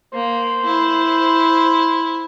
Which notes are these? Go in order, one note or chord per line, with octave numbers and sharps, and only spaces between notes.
A#3 C5
E4